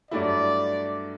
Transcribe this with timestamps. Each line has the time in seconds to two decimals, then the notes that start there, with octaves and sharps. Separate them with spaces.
0.11 G2 F#3 A3 E4 D5